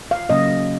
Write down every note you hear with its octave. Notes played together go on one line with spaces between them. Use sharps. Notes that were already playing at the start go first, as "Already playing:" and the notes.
F5
C#3 F#3 A#3 C#4 D#5